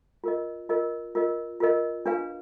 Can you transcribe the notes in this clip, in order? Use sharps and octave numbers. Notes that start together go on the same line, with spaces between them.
F4 A#4 D#5
F4 A#4 D#5
F4 A#4 D#5
F4 A#4 D#5
D4 F4 B4 F5 G#5